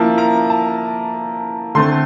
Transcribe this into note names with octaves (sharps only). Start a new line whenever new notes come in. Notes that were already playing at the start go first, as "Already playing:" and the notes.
Already playing: F3 A#3 E4 A5
A#5
A5
D3 A3 C4 C6